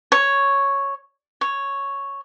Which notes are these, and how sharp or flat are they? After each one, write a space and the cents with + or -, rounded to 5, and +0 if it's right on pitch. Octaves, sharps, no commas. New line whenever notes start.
C#5 +0
C#5 +0